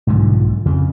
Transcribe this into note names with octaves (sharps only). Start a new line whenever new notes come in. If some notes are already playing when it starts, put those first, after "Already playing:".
B1 G#2 D3 F3
F2 C#3